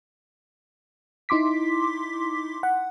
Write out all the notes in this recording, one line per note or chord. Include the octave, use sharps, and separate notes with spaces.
D#4 E4 C6 D6 B6
F#5